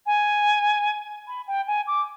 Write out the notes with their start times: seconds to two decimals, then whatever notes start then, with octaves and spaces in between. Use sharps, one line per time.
0.06 G#5
1.27 B5
1.47 G5
1.67 G#5
1.87 D6